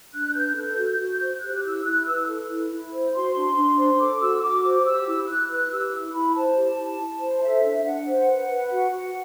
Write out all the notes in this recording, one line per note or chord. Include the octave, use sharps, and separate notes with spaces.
D4 F#6
B4 G6
A4 G6
F#4
F#4
C5
G4 F#6
E4 E6
E4 F#6
B4 E6
A4
E4
E4
C5
F#4 C6
D4
D4
C5
A4 D6
F#4 E6
F#4 D6
C5 D6
G4 E6
E4 E6
E4 F#6
B4 F#6
G4 E6
E4
E4 B5
C5 A5
G4
E4
E4
C5
A4 E5
D4
D4 F#5
C5
B4
B4
F#4
F#4